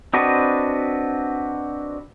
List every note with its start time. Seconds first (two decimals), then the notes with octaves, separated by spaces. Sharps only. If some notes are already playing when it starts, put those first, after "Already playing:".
0.13 C4 D4 F#4 B4 D#5